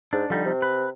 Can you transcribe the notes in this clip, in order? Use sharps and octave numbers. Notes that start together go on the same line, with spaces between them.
G#2 D4
D3 F3 G3 D#4
C3
B4